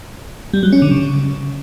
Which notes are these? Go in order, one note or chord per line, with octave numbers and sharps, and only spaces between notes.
G3
F#3
C#4
D3
C#3